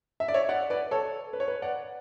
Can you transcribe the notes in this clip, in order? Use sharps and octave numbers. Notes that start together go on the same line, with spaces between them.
E5
D5
C#5 E5
D5 F#5
B4 D5
A4 C#5
B4
C#5
B4
D5 F#5